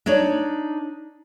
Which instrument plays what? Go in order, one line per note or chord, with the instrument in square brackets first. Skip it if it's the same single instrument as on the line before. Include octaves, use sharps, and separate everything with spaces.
[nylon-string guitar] D4 D#4 C#5 D5